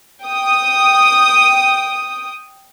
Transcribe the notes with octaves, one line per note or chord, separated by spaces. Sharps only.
G5 D#6